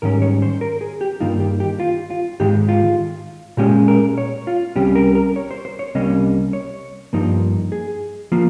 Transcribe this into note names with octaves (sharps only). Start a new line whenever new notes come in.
G#2 D#3 G3 C#4 A#4
C#5
C5
A#4
G#4
G4
G2 D#3 A#3 D#4 F4
G4
G4
F4
F4
G#2 D#3 G#3 G4
F4
A#2 G#3 C#4 G4
A#4
C#5
F4
C2 C3 G3 C#4 G4
A#4
A#4
C#5
C5
C5
C#5
C2 C3 G3 A#3 C#4 D#5
C#5
G2 F3 A#3 D#4
G#4
F3 A#3 F4